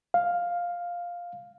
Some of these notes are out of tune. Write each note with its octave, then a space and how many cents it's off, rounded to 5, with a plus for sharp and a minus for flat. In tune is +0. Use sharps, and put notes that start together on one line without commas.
F5 +5